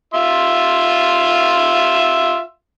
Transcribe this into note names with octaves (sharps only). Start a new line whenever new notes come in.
F4 E5 C6